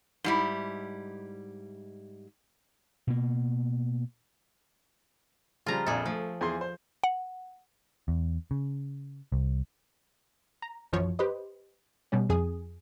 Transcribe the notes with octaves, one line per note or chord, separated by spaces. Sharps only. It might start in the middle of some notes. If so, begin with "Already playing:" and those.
G#2 G3 E4
B2 A#3
C#3 F3 G3 F4 A#5
A#1 F2 G#4 A4 D5
F3 A3
E2 G#4 C6
C5
F#5
E2
C#3
C2
A#5
A#1 F#2 E3 F3 C#5
G4 B4 C5 D#5
B2 G3 C#4
F2 G#4 G#5 D#6